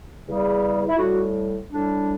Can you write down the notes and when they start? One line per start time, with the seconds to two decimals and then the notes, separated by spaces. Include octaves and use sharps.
0.26 E2 C#3 G3
0.88 E4
0.98 A2 G3 F#4
1.69 A2 G3 D4